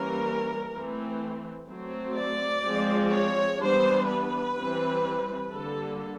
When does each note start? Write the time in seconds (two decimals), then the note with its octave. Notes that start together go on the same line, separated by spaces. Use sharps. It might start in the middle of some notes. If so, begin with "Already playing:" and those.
Already playing: E3 G3 A#3 C#4 A#4
0.71 E3 A3 C4
1.67 F#3 A3 C4
2.16 D5
2.64 F3 G#3 C4
3.11 C#5
3.60 E3 G3 B3 D4 C5
4.07 B4
4.56 E3 G3 C4
5.52 D3 G3 A#3 A4